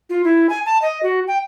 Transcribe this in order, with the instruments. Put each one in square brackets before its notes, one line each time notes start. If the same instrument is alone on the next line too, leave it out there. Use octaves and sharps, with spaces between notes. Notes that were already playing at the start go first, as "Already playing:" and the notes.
[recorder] F4
E4
G#5
A5
D#5
F#4
G5